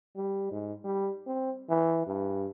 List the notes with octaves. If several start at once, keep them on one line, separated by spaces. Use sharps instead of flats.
G3
G#2
G3
C4
E3
G2